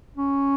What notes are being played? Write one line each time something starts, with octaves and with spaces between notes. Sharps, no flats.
C#4